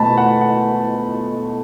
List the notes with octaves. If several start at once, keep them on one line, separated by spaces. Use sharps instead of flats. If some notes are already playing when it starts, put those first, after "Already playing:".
Already playing: B2 A3 A5 B5
F#5
F#5